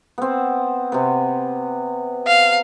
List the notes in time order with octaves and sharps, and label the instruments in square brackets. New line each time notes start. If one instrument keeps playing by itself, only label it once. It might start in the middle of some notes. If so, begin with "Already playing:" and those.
[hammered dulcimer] B3 C4
C3 B3
[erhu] F5